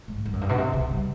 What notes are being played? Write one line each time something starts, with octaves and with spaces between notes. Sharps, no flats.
G#2
G2
F#2
G2
B2
C3
C#3
G3